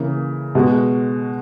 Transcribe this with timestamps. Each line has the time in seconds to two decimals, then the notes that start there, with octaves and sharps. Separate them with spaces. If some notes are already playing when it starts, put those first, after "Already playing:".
Already playing: C#3 E3 A#3
0.55 B2 G#3 B3 F#4